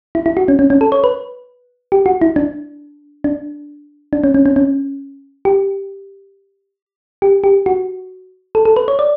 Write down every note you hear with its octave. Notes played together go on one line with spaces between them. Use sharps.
E4
E4
F#4
C#4
C#4
C#4
A4
C#5
B4
G4
F#4
E4
D4
D4
D4
C#4
C#4
C#4
C#4
G4
G4
G4
F#4
A4
A4
B4
C#5
D5